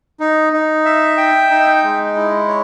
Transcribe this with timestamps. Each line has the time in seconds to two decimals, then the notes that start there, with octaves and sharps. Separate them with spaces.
0.20 D#4
0.53 D#4
0.85 E5
1.17 G5
1.50 D#4
1.83 G#3
2.16 E4
2.48 C#5